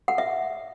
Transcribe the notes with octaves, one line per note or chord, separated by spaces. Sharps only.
F#5
E5